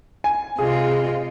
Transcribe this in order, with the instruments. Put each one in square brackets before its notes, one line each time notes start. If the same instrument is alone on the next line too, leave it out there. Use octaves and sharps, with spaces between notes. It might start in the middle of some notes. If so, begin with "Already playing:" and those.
[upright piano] G#5
[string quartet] C3 G#3 F4 [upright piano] G#4